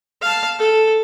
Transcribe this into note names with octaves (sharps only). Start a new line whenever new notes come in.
F5 A5
A4